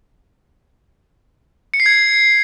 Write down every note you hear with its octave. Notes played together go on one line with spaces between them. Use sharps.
C#7
C7
G#6